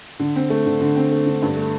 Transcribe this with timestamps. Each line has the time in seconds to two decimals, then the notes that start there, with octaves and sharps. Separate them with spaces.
0.19 D3
0.36 C4
0.50 A3
0.66 D3
0.81 D3
0.96 C4
1.11 A3
1.26 D3
1.42 G2
1.56 A3